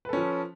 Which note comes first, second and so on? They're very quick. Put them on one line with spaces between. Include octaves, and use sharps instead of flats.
B4 A4 C#4 F3